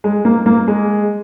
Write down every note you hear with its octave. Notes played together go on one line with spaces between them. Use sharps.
G#3
A#3
A#3
G#3